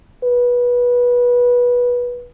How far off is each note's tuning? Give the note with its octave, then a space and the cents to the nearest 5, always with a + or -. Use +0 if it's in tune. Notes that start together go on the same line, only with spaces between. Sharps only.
B4 -20